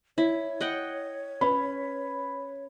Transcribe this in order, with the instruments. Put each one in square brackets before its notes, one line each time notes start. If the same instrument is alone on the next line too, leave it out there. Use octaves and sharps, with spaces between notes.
[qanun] E4 [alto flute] C#5
[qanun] D#5 F#5 G5
[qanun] C#4 [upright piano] B4 B5